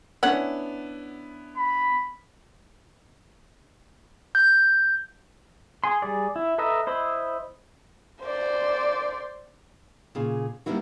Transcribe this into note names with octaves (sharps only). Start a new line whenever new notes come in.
B3 C#4 D4 E4 F#5
B5
G6
G#4 G#5 C6
G3 G#4 D5
E4
A4 B4 D#5 E5 A#5
E4 C5 D#5 B5 E6
C5 D5
A#2 C#3 G#4
G3 A#3 B3 D4 E4 F#4